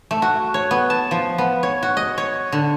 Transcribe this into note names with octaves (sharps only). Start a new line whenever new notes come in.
A3
F#4
C#5
B3
A5
F3
B3
C#5
F#4
D#5
C#5
D3